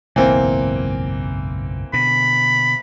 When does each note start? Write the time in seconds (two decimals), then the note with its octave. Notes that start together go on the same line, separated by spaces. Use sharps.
0.16 F#1 B1 G#2 E3 A#3 C4
1.93 B2 D3 B5